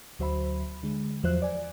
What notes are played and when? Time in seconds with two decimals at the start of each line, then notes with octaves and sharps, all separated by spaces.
0.19 D2 F#3 C5 E5 B5
0.83 D3 G#3
1.23 E2 F3 F#3 C5 E5 F#6
1.42 D5 G#5